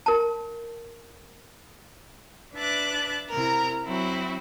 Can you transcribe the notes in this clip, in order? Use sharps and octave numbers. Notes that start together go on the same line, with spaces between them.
A#4 A5
D4 B4 E5 A5 D6 F#6
C3 E4 A#4 A#5
F#3 C4 E4 F#4